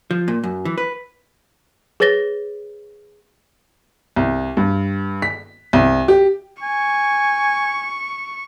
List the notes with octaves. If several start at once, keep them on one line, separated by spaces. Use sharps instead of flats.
F3
A#2
F#2
E3
B4
G#4 B4 C#5 A6 A#6 G7
C2
G2
B6
C2
G4
G#5 C#6